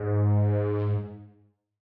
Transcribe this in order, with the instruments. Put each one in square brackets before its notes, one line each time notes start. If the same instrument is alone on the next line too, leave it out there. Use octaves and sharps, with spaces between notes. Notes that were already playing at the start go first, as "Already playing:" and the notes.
Already playing: [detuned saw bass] G#2